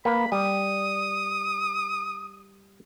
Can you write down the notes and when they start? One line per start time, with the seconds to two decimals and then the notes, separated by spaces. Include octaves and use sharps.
0.05 A#3 B4 B5
0.32 G3 D#6